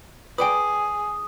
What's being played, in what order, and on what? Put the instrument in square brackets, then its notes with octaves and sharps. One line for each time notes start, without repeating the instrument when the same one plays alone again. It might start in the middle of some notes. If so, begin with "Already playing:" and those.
[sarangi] G#4 [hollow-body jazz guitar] B4 D5 G5 [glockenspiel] D#6